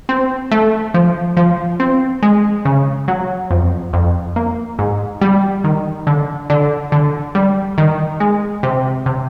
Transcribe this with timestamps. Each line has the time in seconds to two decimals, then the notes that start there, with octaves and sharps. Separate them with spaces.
0.09 C4
0.52 A3
0.94 F3
1.37 F3
1.80 C4
2.23 G#3
2.65 C#3
3.08 F#3
3.51 F2
3.93 F2
4.36 A#3
4.79 G#2
5.21 G3
5.64 D#3
6.07 D3
6.50 D3
6.92 D3
7.35 G3
7.78 D#3
8.20 G#3
8.63 C3
9.06 C3